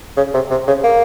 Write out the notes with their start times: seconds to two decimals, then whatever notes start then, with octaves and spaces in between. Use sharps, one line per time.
0.17 C#3
0.34 C3
0.50 C3
0.67 C#3
0.84 A#3